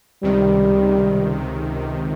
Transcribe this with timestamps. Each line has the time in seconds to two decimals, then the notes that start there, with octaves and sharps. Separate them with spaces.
0.23 C#2 C3 D#3 G3